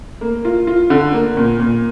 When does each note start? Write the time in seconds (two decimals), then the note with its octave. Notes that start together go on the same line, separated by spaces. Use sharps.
0.21 A#3
0.45 F4
0.67 F4
0.90 D3
1.13 A#3
1.37 A#2
1.60 A#2